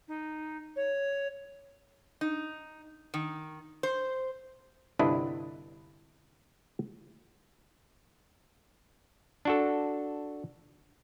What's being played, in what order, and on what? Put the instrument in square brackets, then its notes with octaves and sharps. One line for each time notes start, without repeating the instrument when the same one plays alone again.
[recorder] D#4
C#5
[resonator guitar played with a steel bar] D#4
D#3
C5
[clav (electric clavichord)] G1 C3 D4 E4 B4 D#5
D4 F#4 A4